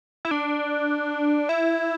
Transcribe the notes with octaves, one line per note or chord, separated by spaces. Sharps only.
E4
D4
E4